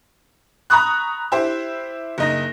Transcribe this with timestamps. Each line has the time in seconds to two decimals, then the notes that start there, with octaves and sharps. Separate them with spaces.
0.70 A#5 B5 C#6 D#6 F#6
1.32 E4 G4 C5
2.18 F#1 D#4 A#6